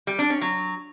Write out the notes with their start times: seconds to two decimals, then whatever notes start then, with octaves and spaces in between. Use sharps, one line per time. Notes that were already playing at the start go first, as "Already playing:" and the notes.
0.07 G3
0.19 D4
0.30 C#4
0.41 F#3